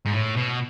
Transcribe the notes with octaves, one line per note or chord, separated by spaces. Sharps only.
G#2
A2
B2